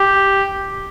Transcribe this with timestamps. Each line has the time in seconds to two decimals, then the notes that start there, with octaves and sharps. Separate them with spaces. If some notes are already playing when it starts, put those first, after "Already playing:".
Already playing: G4